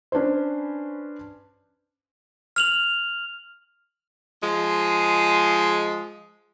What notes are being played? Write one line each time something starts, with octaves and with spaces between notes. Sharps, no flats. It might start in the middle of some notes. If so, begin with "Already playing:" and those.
C#4 D4 B4 C5
F6 F7 F#7
F3 G#3